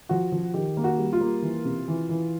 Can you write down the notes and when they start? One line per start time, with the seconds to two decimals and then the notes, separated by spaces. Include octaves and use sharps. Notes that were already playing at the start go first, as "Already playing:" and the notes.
0.09 F3 F#4
0.32 F3
0.54 D#3 G4
0.77 A#3
0.84 F#4
0.98 G3
1.13 F4
1.21 A#3
1.42 E3
1.65 C3
1.88 E3
2.09 E3